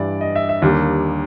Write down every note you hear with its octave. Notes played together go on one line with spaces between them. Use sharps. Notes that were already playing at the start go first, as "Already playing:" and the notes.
Already playing: G2 E3 G3 D5
D#5
E5
E5
D#2 D3 G3 A#3